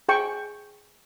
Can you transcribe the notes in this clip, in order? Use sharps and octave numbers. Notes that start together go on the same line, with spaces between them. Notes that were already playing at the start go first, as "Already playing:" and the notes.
G#4 G5 C#6